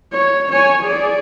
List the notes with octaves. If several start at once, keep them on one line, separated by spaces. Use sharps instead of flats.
C#5
C#5 G#5
G#4 D5